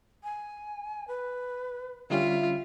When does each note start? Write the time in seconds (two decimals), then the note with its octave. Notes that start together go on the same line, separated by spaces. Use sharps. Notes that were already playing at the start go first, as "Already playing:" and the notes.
0.23 G#5
1.08 B4
2.10 D3 G3 C#4 F4 E5